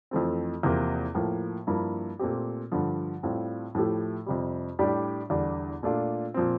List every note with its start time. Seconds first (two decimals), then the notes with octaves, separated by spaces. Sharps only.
0.11 F2 E3 A3 C4
0.63 E2 C3 F3 A#3
1.15 A2 F3 A#3
1.67 G2 F3 A#3 E4
2.19 A#2 A3 C4 G4
2.72 G2 D3 F3
3.23 A2 G3 C4 F4
3.75 A2 F3 A3 E4 G4
4.26 F2 C3 G3
4.79 A2 G3 D4 G4
5.30 E2 D3 G3 D4
5.83 A#2 A3 D4 F4
6.34 A#2 F3 C4